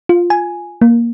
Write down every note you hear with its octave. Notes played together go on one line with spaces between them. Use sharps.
F4
G#5
A#3